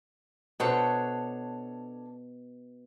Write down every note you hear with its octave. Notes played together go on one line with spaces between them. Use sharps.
B2 D4 A4 C5 C#5